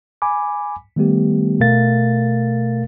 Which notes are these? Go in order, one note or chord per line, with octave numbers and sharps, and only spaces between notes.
G#5 B5 D6
D#3 G3 A3 B3 G4
B2 A3 A#4 F5 A6